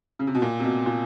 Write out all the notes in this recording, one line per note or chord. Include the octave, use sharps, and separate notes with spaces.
C#3
C3
B2
A#2
C3
B2
A#2